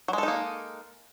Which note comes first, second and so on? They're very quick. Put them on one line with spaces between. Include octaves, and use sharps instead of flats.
F#3 G#3 A4 D#4 A#3